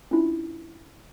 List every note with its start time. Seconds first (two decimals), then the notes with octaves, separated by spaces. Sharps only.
0.11 C#4 D4 E4 F4